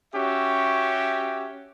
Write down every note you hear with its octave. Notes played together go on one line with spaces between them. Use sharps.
C#4 F#4 G4 E5